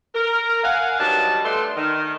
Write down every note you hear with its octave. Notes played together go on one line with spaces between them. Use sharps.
A#4
F5 F#5 G#5
D#3 F#3 G3 D4 B4 A5
A3 B3 D4 C6
D#3